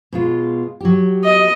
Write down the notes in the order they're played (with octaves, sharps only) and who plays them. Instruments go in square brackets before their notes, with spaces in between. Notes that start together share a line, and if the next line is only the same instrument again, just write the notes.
[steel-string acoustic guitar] B2 G#3 F4
F#3 G4
[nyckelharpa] D#5